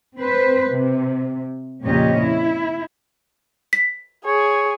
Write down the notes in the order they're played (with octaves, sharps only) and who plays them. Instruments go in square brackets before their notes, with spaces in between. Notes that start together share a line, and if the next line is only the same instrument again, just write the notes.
[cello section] C4 B4 C5
C3
F2 A#2 C#3 C#4 G4 D#5
E4
[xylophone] B6
[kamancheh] G#4 [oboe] C#5